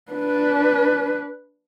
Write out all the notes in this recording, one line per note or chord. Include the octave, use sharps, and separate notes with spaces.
D4 B4